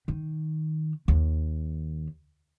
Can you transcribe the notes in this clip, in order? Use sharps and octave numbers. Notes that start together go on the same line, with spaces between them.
D#3
D#2